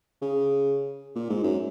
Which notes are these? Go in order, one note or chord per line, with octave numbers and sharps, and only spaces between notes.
C#3
A#2
G#2
F#2